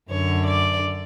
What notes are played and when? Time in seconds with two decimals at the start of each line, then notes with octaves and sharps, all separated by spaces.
0.09 F#2 D3 C#5
0.44 D5